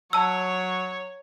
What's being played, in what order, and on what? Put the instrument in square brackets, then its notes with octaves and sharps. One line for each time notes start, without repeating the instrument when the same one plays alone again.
[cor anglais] F#3 [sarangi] C#5 [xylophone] A5 E6